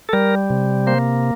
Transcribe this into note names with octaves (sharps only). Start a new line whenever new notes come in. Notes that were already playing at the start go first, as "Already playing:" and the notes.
A4
G3 A#4
C3
A#3 C5